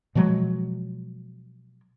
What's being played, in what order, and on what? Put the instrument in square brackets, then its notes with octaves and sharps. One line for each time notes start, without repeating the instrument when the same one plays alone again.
[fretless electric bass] B2 F3 F#3 G#3